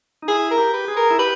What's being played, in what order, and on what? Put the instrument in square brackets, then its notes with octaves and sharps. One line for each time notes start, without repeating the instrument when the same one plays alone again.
[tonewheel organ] D#4
[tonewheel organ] E4 [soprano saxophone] G#4
[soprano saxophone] A#4
[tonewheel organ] G4
[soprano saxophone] B4
[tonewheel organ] G#4
[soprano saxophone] A#4
[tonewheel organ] E4
[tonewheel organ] G4 [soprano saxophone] B4